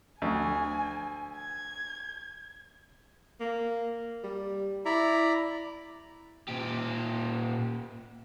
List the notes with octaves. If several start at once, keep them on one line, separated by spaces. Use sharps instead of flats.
D2 G#5
G#6
A#3
G3
E4 D5 A#5 B5
A#2 G4